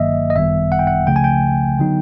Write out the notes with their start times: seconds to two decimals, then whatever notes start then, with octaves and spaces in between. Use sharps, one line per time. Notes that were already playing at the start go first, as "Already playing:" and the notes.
Already playing: G1 G2 D#3 F#3 A#3 D#5 E5
0.30 D#5
0.36 G#1 F#2 D#3 G3 B3 E5
0.72 F#5
0.79 G5
0.87 F#5
1.07 C#2 C#3 F3 A3 G5
1.16 G#5
1.24 G5
1.79 D3 F#3 B3 D#4